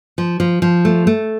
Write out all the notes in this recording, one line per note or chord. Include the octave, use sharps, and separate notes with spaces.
F3
F3
F3
A3
A3